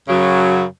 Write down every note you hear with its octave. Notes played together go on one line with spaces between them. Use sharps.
F#2 C#3 F#3